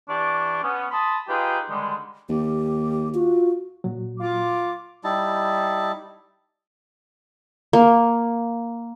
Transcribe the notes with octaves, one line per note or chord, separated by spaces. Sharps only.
E3 D4 G4 D5 C#6
B3 C#4
A5 B5 C6 D#6
D#4 F4 G4 G#4 B4 G5
D3 D#3 G3 G#3
D#2 G4
F4 F#4
A#2 F#3
F4 D6
G3 D#4 E4 A5
A#3